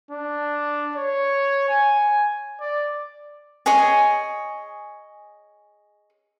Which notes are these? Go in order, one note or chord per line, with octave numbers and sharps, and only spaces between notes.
D4
C#5
G#5
D5
G#4 C#5 D#5 G#5